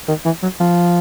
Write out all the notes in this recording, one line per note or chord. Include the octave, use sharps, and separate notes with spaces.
D#3
E3
F#3
F3